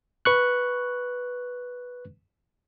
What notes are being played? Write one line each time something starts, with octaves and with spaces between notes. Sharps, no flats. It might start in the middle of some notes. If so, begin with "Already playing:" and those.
B4 C#6 F#6